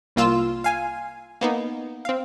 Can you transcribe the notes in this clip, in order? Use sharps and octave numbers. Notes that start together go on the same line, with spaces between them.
C2 A#3 F4 E6 E7
F5 G#5
A#3 B3 D#4
C4 F5